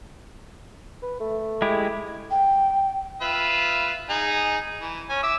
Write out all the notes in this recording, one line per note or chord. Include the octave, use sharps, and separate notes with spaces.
B4
A3
G#3 E4 G4
G5
F4 B4 E5
D#4 G#4
E3
C#4 G#5
E5 D6 E6